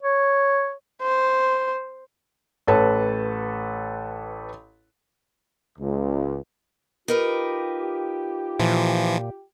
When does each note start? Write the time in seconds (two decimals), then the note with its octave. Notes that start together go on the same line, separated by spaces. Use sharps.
0.02 C#5
1.02 C5
2.67 A1 A4 B4 C#5 A5
5.79 C#2
7.08 D#4 F4 G4 A#4 B4
8.59 A#2 E3 F3